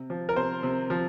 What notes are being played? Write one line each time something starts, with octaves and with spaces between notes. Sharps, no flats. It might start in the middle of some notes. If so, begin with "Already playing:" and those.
Already playing: C3
F3
A#4
C3 C5
C3
F3